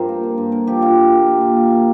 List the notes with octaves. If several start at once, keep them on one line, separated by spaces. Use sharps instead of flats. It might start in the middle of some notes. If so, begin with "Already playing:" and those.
Already playing: G2 F3 C4 A#4 C5
A#3
A#3
G2
D3 A#4
F3 G4
D3 F4
D3
A#3
A#2
A#2
A#3
A#3